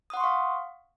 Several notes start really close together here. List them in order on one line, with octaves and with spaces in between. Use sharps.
D#6 F#5 C6 C#6 F5